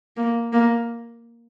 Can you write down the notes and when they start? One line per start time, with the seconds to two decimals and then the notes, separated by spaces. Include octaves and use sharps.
0.17 A#3
0.53 A#3